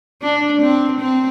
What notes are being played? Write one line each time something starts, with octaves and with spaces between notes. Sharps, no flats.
D4
C4
C4